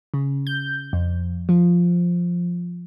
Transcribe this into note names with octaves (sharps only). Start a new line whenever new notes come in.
C#3
G6
F2
F3